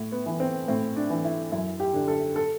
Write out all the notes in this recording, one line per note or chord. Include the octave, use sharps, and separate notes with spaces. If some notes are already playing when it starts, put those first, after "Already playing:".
Already playing: A2
B3
E3
C4
A2 C4
D4
E3
E4
F#2 E4
G4
D3
A4
A4